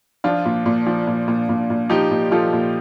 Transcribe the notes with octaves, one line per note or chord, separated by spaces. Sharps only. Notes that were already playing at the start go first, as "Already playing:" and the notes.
F3 D4 F4
A#2
A#2
F3
A#2
A#2
A#2
A#2
F3 D#4 G4
A#2
F3 F4 A4
A#2